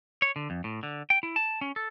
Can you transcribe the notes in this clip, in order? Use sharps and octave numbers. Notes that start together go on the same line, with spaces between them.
C#5
D3
F2
A2
D3
G5
E4
A5
C#4
A4